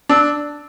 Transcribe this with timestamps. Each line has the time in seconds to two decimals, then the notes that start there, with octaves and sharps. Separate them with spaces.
0.09 D4 E6